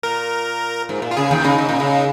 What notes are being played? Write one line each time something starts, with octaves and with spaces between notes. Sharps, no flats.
A#2 A#4
G#2
A#2
F4
C#3 G#4
D#2 D#3
C#3 D#4
C#3
A#2
C#3